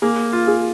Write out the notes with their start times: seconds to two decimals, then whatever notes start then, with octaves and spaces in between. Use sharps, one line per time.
0.02 A#3 G#4
0.33 F4
0.47 G#4